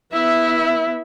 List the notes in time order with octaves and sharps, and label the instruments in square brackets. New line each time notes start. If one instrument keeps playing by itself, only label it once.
[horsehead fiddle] B3 E5 [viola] E4